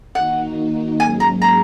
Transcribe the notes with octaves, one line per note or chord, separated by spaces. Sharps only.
D#3 A#3 D#4 F#4 F#5
G#2 F#3 A#3 C#4 G#4 G#5
A#5
A#5